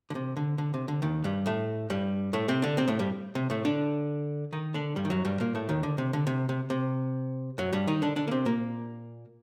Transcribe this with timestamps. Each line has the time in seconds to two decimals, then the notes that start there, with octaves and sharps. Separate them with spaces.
0.10 D3
0.15 C3
0.37 D3
0.58 D3
0.74 C3
0.88 D3
1.02 D#2 D#3
1.24 G2 G3
1.46 A2 A3
1.90 G2 G3
2.33 A2 A3
2.48 C3 C4
2.62 D3 D4
2.77 C3 C4
2.88 A2 A3
2.99 G2 G3
3.35 C3
3.50 A2 A3
3.65 D3 D4
4.53 D#3 D#4
4.74 D3 D4
4.96 G2 G3
5.05 D#3
5.10 F#2 F#3
5.25 G2 G3
5.40 A#2 A#3
5.55 A2 A3
5.69 D#2 D#3
5.83 D3
5.98 C3
6.13 D3
6.27 C3
6.49 C3
6.70 C3
7.58 F#2 F#3
7.73 G2 G3
7.87 D#3 D#4
8.02 D3 D4
8.16 D3 D4
8.28 A#3
8.31 C3 C4
8.45 A#2 A#3